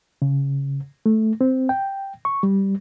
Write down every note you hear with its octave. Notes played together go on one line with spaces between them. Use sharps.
C#3
A3
C4
G5
C#6
G3